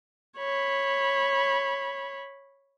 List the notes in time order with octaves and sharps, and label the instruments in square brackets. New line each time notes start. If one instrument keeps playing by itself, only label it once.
[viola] C#5 B5